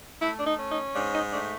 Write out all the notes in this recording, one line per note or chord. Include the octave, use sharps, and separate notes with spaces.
A3 E4
D4
D#4
C#4
D#4
G#2 D4
D#4
A3 D4